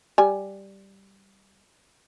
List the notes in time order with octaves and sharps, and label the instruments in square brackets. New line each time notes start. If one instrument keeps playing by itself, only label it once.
[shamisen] G3 G#5